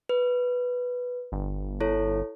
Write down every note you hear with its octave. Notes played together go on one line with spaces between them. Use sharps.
B4
G1
E4 A4 C#5